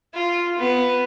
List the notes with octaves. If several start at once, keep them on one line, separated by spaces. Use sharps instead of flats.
F4
B3